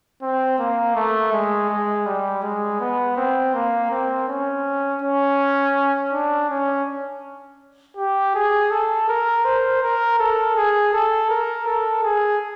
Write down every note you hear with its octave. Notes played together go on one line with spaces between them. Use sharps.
C4
A#3
A3
G#3
G#3
G3
G#3
B3
C4
A#3
C4
C#4
C#4
D4
C#4
G4
G#4
A4
A#4
C5
A#4
A4
G#4
A4
A#4
A4
G#4